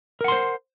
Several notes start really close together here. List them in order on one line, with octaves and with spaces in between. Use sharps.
A#4 F#5 C6 C5